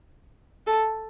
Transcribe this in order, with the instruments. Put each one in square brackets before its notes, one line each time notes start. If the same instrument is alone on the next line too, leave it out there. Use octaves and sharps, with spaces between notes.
[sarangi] A4